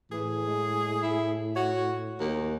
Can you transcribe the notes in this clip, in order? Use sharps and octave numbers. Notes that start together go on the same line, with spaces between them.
A2 E3 G#4
G#3
E4
F#4 C#5
D#2 A#4